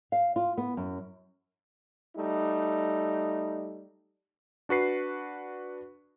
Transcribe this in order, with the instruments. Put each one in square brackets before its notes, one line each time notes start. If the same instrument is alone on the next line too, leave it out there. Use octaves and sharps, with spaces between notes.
[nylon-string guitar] F5
F4
B3
F#2
[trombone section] G3 A3 D#4
[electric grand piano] D4 F#4 B4 C7